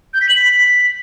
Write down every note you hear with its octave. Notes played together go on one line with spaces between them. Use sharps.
G6
B6
F#7
B6